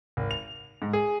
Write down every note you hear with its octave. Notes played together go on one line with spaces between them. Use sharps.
G#1
F7
G#2
G#4